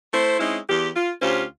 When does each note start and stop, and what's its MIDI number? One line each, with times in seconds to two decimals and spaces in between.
0.13 0.38 57
0.13 0.38 64
0.13 0.38 72
0.40 0.58 56
0.40 0.58 60
0.40 0.58 61
0.40 0.58 63
0.40 0.58 64
0.69 0.89 40
0.69 0.89 67
0.95 1.11 65
1.21 1.44 38
1.21 1.44 61
1.21 1.44 65
1.21 1.44 67
1.21 1.44 72